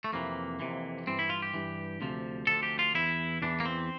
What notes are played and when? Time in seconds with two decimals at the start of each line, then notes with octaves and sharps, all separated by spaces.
0.04 A3
0.13 F2 C3 E3 A#3
0.60 F2 C3 E3
1.07 G2 E3 C4
1.19 E4
1.30 F4
1.42 G4
1.54 G2 E3
2.01 D2 C3 F3
2.47 D2 C3 F3 A4
2.63 G4
2.79 F4
2.94 E2 E3 E4
3.42 E2 E3 D4
3.60 A#3
3.65 C4